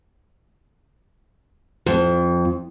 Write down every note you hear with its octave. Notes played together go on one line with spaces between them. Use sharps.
F2